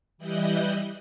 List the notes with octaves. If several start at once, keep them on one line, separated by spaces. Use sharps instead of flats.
E3 G3 E4 D#5 F#6 G6